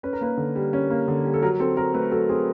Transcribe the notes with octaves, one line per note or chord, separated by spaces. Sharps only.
C#4 B4
A#4
A#3 B4
D3
G3
C#4
A#3
D3
G3
A4
F#3 A#4
C4 A4
F#3 A#4
A3 B4
F#3 A4
C4 G#4